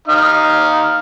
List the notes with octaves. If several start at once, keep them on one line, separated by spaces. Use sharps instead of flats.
D#4 F5